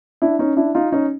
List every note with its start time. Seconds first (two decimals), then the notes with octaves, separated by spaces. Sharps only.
0.22 D4 E4
0.39 C#4 D#4
0.57 D4 E4
0.75 D#4 F4
0.92 C#4 D#4